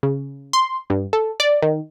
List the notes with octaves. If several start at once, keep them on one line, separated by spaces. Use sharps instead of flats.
C#3
C6
G2
A4
D5
D#3